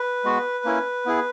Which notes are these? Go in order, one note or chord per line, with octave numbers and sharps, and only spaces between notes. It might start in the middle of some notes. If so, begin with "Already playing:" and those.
Already playing: B4
G#3 B3 F#4
A#3 C#4 E4
B3 E4 G#4